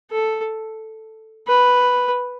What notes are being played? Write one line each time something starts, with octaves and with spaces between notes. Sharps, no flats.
A4
B4